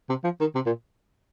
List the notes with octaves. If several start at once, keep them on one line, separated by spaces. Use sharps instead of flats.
C3
F3
D#3
C3
A#2